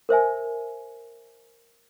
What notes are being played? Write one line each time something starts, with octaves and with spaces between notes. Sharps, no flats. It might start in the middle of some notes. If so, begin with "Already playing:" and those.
A#4 C5 E5 G#5